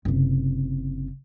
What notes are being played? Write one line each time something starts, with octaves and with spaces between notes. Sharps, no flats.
F#1 C3